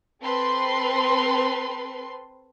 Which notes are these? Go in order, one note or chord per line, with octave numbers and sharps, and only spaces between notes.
C4 A4 B4 C6